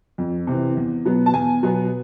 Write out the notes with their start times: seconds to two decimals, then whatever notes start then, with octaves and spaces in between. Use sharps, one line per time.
0.18 F2
0.47 C3 E3
0.77 E2
1.05 B2 F#3 B3
1.26 A5
1.34 E2 G#5
1.63 B2 F#3 B3